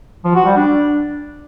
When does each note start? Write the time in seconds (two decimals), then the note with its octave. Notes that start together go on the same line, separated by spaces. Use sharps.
0.25 F3
0.35 F#4
0.46 G3
0.56 D4